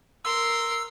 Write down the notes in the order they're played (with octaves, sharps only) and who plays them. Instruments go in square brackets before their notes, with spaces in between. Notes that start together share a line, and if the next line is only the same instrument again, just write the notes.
[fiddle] A#4 C6 [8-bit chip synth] E6